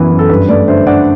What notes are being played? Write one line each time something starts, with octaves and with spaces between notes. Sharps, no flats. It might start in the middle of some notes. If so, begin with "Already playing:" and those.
Already playing: F#2 E3 B3
F#2
A4
G2 B4
A3 B4 D5
D3 C5 E5
D4 D5 F#5